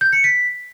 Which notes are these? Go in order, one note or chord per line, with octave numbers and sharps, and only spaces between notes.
G6
C#7
B6